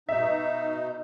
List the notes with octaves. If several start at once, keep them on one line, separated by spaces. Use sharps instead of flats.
B2 D#4 E5